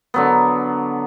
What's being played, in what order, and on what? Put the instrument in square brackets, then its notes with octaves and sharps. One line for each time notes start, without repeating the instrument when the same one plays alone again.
[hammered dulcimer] D3 F#3 B3